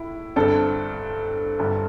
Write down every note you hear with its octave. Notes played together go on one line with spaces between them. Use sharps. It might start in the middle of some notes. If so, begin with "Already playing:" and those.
Already playing: A2 E4
G1 G2 D3 C4 A4
G1 G2 D3